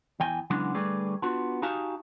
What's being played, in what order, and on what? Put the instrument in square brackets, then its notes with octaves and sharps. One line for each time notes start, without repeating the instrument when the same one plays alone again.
[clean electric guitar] E2 E3 G5 G#5
C#3 E3 F#3 G#3 B3 D4
D3 G3 A3 G#4 B4 D5
B3 D4 F4 F#4
D#4 F#4 G4 F5 G#5 A5